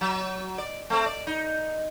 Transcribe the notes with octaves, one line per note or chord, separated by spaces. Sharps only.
F#3
D5
A3 C4
D5
D#4